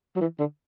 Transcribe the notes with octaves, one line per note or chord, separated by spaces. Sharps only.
F#3
E3
D3